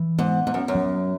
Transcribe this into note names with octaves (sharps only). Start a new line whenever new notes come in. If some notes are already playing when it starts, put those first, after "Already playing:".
Already playing: E3
G#2 B3
G#2 B3
F#2
F#2
F#3